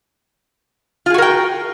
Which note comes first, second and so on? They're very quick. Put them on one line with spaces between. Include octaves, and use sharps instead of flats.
F4 G#4 F#4 A#4 G5